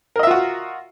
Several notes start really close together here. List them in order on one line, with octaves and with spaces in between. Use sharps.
A#4 D#5 E5 F4 F#4